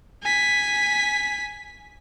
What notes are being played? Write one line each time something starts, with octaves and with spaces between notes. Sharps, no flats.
G#5 B6